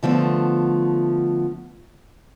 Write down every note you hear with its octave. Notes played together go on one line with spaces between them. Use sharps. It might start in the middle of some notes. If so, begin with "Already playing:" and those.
D3 F3 A3 B3